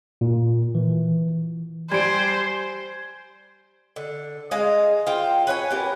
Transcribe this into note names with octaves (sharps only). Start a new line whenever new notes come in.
A#2
E3
G3 C5 G#5 D7
D3
G#3 D#5 F5
F4 C5 G5
B4 C#5 F5 G#5
B3 G4 A#4